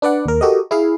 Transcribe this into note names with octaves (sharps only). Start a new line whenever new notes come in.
D4 B4 D5 F#5
D#2 A#4
F#4 G4 A4 A#4 D#5
E4 G#4 F5